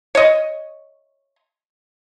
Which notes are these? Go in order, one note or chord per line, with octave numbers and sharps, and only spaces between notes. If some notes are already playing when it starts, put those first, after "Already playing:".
C#5 D#5